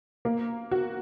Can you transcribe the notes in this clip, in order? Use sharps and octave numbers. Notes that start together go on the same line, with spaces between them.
A#3
F#4